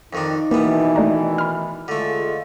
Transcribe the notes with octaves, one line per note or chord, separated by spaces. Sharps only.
F2 D#3 D4 D#4
B2 D#3 E3 G3 A#3 B3
A3 D4 A#5
B5 F6
D3 G#3 A3 F4